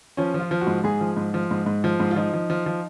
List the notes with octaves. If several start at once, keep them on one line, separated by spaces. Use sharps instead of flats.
F3 C#4
F3 F4
F3
F#4
G#2
G#2 G#4
F3
G#2
F3
G#2
G#2
F3
G#2
F4
F3 D#4
F3
F3
F3